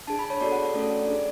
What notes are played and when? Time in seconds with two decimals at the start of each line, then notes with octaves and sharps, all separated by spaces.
0.07 D4 G#4 A5
0.19 B5
0.30 C#5
0.41 B3 F#4 A4 D5
0.52 F#5
0.63 D5
0.74 A3 C#4 F#4 A4 D5
1.07 D4 G#4